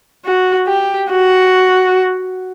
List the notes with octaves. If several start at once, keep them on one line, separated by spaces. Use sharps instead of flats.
F#4
G4
F#4